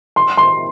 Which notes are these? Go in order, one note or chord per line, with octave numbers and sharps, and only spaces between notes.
C6
C6